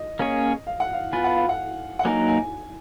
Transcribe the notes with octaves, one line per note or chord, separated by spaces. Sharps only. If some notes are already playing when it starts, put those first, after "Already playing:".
Already playing: D#5
A#3 C#4 G#4 C#5
F5
F#5
F5
B3 F4 B4 G#5
F#5
F5
F#5
F#5
F#3 A#3 D#4 A#4 G#5
G#5